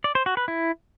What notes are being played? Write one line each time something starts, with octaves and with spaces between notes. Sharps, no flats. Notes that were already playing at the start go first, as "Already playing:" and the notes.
D5
C5
F#4
B4
E4